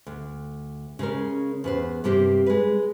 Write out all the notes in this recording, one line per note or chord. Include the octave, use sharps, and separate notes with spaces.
D2
C#3 G#3 C#4 A#4
E2 B4 C5
G2 C3 A#3 C4 G4 C5
G#3 B4